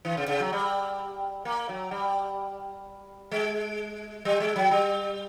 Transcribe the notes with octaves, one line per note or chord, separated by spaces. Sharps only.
E3
C#3
C#3
F#3
G3
A#3
F#3
G3
G#3
G3
G#3
F#3
G3